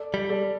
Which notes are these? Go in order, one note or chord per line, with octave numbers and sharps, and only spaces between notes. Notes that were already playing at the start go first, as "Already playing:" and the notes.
Already playing: A4 D5
G3
A4 D5